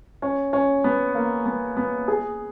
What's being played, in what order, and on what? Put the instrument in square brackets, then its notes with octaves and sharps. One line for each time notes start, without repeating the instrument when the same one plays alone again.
[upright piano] C#4
C#4
B3
A#3
B3
B3
G#4